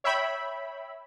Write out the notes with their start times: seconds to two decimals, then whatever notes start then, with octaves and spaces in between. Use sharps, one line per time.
0.04 C#5 E5 G5 B5